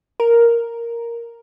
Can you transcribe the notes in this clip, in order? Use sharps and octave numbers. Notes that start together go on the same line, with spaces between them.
A#4